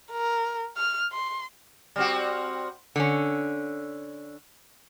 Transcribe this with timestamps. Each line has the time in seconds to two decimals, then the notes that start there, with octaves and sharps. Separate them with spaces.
0.12 A#4
0.77 F6
1.12 C6
1.96 G3 C4 F#4
2.96 D3 C#4